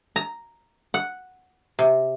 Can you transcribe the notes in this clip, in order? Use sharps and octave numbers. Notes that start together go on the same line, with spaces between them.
A#5
F#5
C3